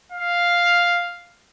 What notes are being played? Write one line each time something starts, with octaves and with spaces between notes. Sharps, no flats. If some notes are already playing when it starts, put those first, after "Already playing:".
F5